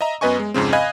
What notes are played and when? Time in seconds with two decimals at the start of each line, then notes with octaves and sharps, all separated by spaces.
0.01 D#5 E5 A#5
0.21 F#2 B3 B4 D#5 G#5 C#6
0.39 G#3
0.54 F2 G#2 C#3 C4
0.73 D#5 F5 G#5 B5 F#6 G#6